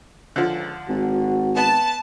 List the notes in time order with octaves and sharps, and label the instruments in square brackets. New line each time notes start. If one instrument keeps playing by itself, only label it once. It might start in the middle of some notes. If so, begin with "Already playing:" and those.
[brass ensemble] C#2 [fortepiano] D3 F3
[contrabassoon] G#1 [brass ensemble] F#4
[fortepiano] B3 [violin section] A5